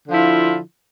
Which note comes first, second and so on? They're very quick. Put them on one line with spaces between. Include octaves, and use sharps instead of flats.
D3 F3 E4 F4